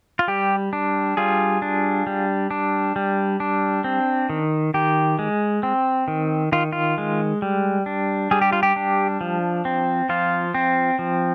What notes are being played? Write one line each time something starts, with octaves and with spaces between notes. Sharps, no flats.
F4
G3 G4
D4
G3 F4 G#4
D4
G3
D4
G3
D4
C4
D#3
D#3 G4
G#3
C4
D#3
D#3 F4
F4
G#3
G3
D4
G3 G#4
G4
F4
G4
D4
F3
C4
F3 F4
C4
F3